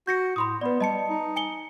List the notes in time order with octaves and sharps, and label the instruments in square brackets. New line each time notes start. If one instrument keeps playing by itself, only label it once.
[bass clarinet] F#4 [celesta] G6 A#6 C#7
[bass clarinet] A2 [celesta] B5 C6 D#6
[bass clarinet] B3 [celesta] B4 D5
[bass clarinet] G3 [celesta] D#5 A5 C#7
[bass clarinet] D#4
[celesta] G#5 C#7 G7